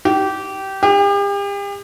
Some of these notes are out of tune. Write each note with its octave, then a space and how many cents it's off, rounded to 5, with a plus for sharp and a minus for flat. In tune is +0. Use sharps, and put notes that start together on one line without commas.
G4 -20
G4 +40